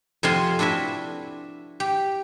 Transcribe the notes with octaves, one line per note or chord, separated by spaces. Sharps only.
F2 C3 F4 F#5 G#5 C6
D4 E4 F#4 B4 E5
G4